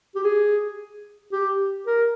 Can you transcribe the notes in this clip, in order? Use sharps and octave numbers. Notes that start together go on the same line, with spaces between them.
G4
G#4
G4
A#4